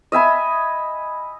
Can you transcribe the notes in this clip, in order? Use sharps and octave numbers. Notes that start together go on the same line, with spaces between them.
D#5 E5 G#5 B5